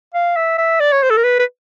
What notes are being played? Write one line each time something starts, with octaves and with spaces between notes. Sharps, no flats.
F5
E5
E5
D5
C#5
C5
A4
A#4
B4
B4